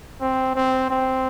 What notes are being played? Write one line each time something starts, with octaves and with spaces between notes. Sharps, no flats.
C4
C4
C4